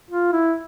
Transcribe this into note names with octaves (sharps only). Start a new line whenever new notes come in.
F4
E4